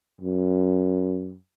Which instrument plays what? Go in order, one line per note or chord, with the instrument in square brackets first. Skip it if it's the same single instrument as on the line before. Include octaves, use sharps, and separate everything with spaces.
[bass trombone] F#2